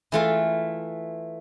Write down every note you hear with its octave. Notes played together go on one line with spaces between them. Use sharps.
E3 A3 F4